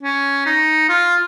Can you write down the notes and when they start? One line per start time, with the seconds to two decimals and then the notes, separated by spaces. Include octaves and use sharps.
0.03 C#4
0.46 D#4
0.89 F4